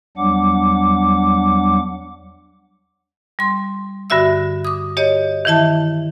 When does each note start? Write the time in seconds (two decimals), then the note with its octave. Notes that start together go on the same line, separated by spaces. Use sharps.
0.17 E2 F#3 G3 D4 F#5 D6
3.39 G3 C6
4.10 G2 D3 F#4 E5 E6
4.65 D6 D#6
4.97 G4 C#5 D#5
5.45 D#3 E3 E4 E5 A5